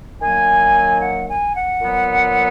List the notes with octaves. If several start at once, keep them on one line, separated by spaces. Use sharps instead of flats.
D#3 F#3 A#3 G#5
F#5
G#5
F#5
A#2 F#3 B3